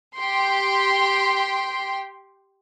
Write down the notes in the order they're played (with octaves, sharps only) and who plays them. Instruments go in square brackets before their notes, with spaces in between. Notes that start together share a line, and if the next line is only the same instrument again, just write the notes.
[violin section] G4 G5 C6